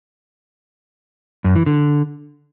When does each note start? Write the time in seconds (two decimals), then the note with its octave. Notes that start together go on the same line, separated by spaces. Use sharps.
1.44 F#2
1.55 E3
1.66 D3